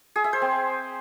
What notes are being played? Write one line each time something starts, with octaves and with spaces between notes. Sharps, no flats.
G#4
E5
C5
C4